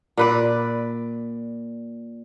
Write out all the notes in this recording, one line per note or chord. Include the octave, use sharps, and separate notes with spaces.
A#2 B4 D5